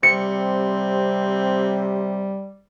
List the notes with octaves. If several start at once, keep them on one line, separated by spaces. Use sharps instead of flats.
C3 G3 C4 C#7